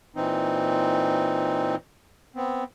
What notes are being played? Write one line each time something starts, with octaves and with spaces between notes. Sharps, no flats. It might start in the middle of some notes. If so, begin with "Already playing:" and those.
A#2 E3 C4 D#4
B3 C4